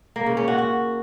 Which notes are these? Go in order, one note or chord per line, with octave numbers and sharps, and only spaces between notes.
A#3
C#3
C#4
F#4
F#4